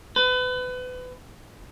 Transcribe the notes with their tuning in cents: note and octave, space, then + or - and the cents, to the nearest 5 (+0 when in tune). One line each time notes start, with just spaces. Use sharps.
B4 +30